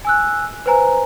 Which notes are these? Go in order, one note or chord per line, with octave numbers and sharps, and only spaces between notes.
G#5 E6 F#6
B4 C5 G#5 A#5